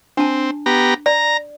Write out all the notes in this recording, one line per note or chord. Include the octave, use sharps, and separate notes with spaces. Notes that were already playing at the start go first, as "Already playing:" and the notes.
C4 D4 A5
B3 G4 A#5
D5 A#5